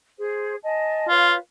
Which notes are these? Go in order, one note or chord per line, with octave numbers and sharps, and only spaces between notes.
G#4 C5
D#5 G#5 A5
F4 B4 C#5 F5